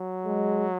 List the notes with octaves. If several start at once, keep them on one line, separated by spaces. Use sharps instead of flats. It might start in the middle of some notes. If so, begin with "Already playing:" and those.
Already playing: F#3
G#3